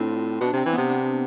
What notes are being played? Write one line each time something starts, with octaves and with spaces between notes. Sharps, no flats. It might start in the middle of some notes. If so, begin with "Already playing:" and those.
Already playing: A2 C4 D4 F4
B2 D4
C3 C4
E3
C3 B3
D4